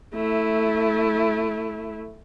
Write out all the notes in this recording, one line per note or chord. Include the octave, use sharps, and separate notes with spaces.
A3 E4